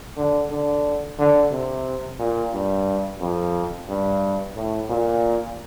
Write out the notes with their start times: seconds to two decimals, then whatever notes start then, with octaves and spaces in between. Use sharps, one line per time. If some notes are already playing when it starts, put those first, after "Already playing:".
0.17 D3
0.50 D3
1.18 D3
1.51 C3
2.19 A#2
2.53 G2
3.20 F2
3.89 G2
4.56 A2
4.89 A#2